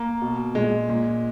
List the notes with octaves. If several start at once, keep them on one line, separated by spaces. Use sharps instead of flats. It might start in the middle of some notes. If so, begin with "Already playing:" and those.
Already playing: A#3
B2
A#2 G#3
A#2